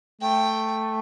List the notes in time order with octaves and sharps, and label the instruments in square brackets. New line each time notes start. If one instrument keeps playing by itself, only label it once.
[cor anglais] A3 [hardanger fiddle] G5